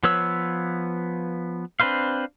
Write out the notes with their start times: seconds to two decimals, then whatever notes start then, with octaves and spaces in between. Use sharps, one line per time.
0.03 F3 B3 B4 C#5 E6
1.80 C4 D4 B4 C5 F5